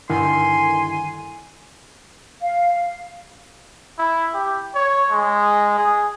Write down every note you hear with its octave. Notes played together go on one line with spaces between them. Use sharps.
G2 D3 D#3 E4 G#5 C6
F5
E4
G4
C#5
G#3
G#4